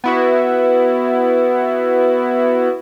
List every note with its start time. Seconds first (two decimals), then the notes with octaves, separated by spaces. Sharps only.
0.04 B3 E4 F#4